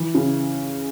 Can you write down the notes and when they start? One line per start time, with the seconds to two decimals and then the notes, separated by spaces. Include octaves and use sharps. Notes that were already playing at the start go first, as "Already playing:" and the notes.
Already playing: E3
0.15 C#3